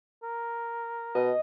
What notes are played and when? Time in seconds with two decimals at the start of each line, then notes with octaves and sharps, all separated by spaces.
0.23 A#4
1.15 B2 D#5